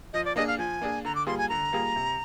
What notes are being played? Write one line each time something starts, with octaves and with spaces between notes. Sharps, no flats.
F3 D#5
D5
A#3 D4 G#4 D#5
F5
F3 G#5
A#3 D4 G#4
D3 A#5
D6
G3 A#3 F4 G#4 C6
G#5
D3 A#5
G3 A#3 F4 G#4
C3